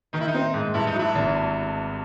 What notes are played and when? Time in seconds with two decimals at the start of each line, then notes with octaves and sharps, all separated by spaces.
0.13 D#3 D#4
0.20 E4
0.28 D#4
0.34 C4
0.54 G#2
0.74 G2 E4
0.87 D#4
0.94 F#3 E4
1.15 G#1